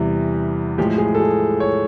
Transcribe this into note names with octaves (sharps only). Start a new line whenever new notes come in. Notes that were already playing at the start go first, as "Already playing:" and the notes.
Already playing: E2 C3 E3 G3
A2 F3 G#3 G4
G#4
A4
G#4
C#5